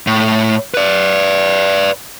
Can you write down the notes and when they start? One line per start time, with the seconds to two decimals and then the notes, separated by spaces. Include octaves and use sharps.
0.07 A2
0.74 B4 D5